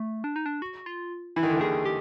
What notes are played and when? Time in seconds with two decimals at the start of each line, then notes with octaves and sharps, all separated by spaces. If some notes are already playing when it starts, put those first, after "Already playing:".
Already playing: A3
0.24 D4
0.36 D#4
0.46 D4
0.62 F#4
0.86 F4
1.36 E3 E4
1.43 D#3
1.50 D3
1.58 D#2 D#3 G#4
1.85 G4